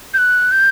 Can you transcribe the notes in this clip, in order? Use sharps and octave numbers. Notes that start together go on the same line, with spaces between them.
G6
F#6
G6